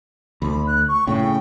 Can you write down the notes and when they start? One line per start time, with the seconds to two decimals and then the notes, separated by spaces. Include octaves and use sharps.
0.42 D2 B5
0.67 F#6
0.88 C#6
1.07 A2 C#3 G5